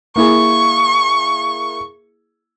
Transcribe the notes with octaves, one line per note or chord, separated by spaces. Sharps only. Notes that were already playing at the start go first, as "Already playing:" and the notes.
A#3 E4 G#4 C#6